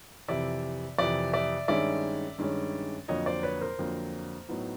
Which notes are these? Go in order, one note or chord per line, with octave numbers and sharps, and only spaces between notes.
F2 C3 E3 D5 E5
F2 C3 E3 D5 E5
D5 E5
G2 D#3 G#3 C#4 D5 E5
G2 D#3 G#3 C#4
F2 D3 F#3 A#3 C#5 D#5
C5 D5
B4 C#5
A#4 C5
F2 D3 F#3 A#3
A2 F#3 B3 D#4